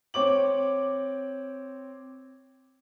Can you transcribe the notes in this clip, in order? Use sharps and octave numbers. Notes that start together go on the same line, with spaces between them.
C4 C#5 D6 F#7